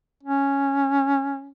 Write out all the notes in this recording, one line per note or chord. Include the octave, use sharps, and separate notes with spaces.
C#4